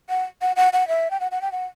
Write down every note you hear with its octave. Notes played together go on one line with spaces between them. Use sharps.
F#5
F#5
F#5
F#5
E5
G5
F#5
F#5
G5
F#5